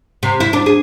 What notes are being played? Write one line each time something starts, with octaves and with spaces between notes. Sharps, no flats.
C3
E4
D4
G#4